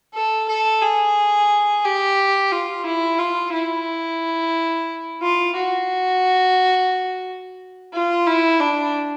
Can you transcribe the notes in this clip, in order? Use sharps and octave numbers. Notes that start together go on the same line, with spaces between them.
A4
A4
G#4
G4
F4
E4
F4
E4
F4
F#4
F4
E4
D4